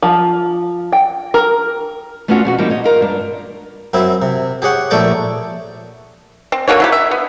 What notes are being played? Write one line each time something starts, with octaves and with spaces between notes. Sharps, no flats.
F3
G5
A#4
A3 B3 C#4 D4 F4 F#4
F2 B2 F#4
E3 G3 A#3 C4 D#4 E4
C#5 D#5
F4 A#4 F5
G2 D4
F#2 C4 E4
C3
G4 G#4 C#5 F#5
A#1 A3 C#5 D5 G5 D6
C4
D3 A#3 F#4 C#5
F#3 E4 G4
E5
B3